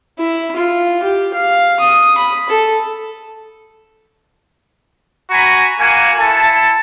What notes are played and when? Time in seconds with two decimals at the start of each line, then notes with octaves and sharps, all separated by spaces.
0.18 E4
0.56 F4
1.03 G4
1.34 F5
1.80 D#6
2.18 B5
2.49 A4
5.31 F#4 G#5 A#5 B5
5.80 A#3 F#4 G#5
6.18 E4 A4 A5